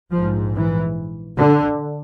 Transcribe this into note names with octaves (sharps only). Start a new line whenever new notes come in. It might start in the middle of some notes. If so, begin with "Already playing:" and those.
A#1 G#2 F3
E3
D3